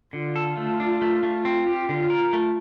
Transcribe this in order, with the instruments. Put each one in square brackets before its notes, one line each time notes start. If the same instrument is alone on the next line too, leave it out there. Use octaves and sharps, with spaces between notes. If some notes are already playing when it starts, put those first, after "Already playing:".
[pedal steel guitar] D3 [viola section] F4
[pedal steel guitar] A4
A3
D4
A3
A3
C4
G4
[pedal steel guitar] D3 [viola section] F4
[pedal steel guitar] A#4
A3